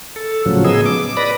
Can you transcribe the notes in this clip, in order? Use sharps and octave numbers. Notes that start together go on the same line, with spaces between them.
A4
A2 C#3 F3 F#3
B3 G#4 D#5 E6
D6
B4 D5 B5 A#6